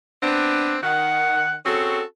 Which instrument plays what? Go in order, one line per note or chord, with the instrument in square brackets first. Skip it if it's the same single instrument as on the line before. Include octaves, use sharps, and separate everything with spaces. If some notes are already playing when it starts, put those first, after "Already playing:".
[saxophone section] B3 C4 D4
D#3 F#5
C4 C#4 F#4 G#4 A4